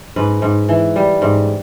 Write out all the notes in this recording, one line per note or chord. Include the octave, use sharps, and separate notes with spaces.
G#2 B4
G#2
E3
G3
G#2